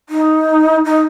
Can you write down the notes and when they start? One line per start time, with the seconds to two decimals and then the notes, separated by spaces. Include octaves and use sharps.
0.09 D#4
0.85 D#4